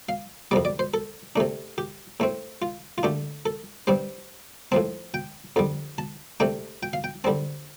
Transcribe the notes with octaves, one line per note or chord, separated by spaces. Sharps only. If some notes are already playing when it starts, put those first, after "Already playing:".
F5
F2 C3 G3 D5
D5
C5
A4
C3 A3 D4
G4
A2 A3 C4
F4
F4
D3 A3 D4 G4
A4
G2 G3 C4 C5
A2 F3 C4 A5
G5
F2 D3 G3
A5
C3 A3 D4 G5
G5
F5
G5
D3 G3 C4 A5